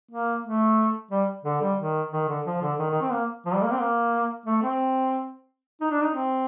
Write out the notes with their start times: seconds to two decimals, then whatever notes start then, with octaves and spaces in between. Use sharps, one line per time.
0.11 A#3
0.44 A3
1.11 G3
1.45 D3
1.61 G3
1.78 D#3
2.12 D#3
2.28 D3
2.46 F3
2.62 D3
2.79 D#3
2.90 D#3
3.01 C4
3.12 A#3
3.46 F3
3.55 G3
3.63 A#3
3.71 C4
3.79 A#3
4.46 A3
4.63 C4
5.81 D#4
5.91 D4
6.02 D#4
6.14 C4